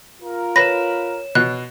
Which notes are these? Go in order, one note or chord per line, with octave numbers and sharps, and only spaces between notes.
F4 A#4
B4 C#5 B5 A#6 E7
B2 F#6